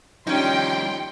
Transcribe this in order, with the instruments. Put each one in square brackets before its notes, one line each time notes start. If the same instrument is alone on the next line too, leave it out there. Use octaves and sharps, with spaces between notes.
[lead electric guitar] F3 G3 [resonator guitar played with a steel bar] C#4 D#4 [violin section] G5 C6